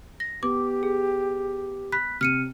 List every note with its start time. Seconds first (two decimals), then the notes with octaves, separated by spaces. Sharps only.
0.20 A#6
0.43 B3 G4 D6
0.83 G#4
1.92 B5 F#6 B6
2.21 C3 F6 C#7 D#7